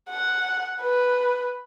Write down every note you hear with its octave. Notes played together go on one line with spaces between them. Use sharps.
F#5
B4